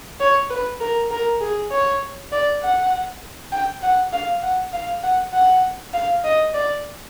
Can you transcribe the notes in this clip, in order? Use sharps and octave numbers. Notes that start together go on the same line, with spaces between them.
C#5
B4
A#4
A#4
G#4
C#5
D5
F#5
G5
F#5
F5
F#5
F5
F#5
F#5
F5
D#5
D5